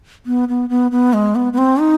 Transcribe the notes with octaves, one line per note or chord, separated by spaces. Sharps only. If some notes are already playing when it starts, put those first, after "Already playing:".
B3
B3
B3
B3
G#3
B3
B3
C4
D#4